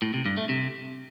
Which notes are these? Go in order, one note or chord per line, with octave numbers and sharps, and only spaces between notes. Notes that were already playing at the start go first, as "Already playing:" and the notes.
A2
C3
G2
A3
C3